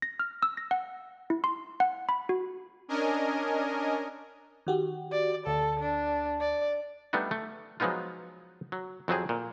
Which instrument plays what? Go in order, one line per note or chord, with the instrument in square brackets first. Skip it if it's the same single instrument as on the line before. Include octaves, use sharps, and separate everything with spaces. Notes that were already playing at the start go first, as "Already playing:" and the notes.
[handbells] A#6
F6
E6
A#6
F#5
E4
C6
F#5
B5
F#4
[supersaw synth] C#4 D4 A#4 D#5 G#5
[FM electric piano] D#3 F#4 G4
[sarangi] D5
[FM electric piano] D2 [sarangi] A4
[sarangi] D4
D5
[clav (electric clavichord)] G3 A3 B3 D4 D#4
A3
F3 F#3 G#3 B3 D#4 F4
F#3
F2 F#3 C4 G#4
A#2